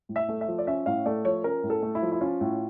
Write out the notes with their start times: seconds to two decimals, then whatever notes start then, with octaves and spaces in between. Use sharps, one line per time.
0.09 A2
0.16 E5
0.29 A3
0.41 E5
0.48 F3
0.58 D5
0.67 C#4 E5
0.86 A2 F5
1.06 A3 D5
1.24 F3 C#5
1.44 C#4 A#4
1.63 A2
1.70 A4
1.82 A3
1.95 E4
2.02 F3
2.12 E4
2.21 C#4 F4
2.41 A2